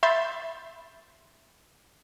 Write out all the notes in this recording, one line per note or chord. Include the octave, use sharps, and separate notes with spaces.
E5 B5 C6 G6 A6